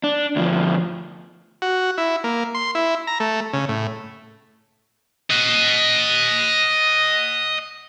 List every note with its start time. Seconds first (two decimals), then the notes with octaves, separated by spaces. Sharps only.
0.04 D4
0.36 D2 F3
1.62 F#4
1.98 E4
2.24 A#3
2.55 C6
2.75 E4
3.07 A#5
3.20 A3
3.53 C#3
3.69 A2
5.30 D#5 F#5